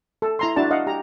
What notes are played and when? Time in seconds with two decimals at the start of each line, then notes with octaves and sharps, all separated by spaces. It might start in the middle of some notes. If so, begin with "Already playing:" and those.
0.22 A4
0.39 E4 A#5 C6
0.56 D4 E4 F#4 D5 A5
0.71 D#5 F5 F#5
0.87 G4 A#5